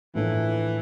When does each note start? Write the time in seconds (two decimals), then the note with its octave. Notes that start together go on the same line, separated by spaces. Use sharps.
0.15 A2 E3 F3 A#3 D4 A4